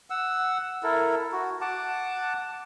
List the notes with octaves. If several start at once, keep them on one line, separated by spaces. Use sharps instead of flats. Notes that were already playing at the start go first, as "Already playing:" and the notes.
F#5 E6
E4 A4 A#4
F#4
F#5 A5 D6